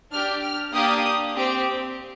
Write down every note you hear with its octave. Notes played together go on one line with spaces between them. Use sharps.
D4 G4 F6
F6
A#3 D4 G4 D#6
C4 G4